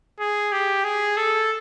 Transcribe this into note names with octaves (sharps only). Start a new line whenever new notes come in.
G#4
G4
G#4
A4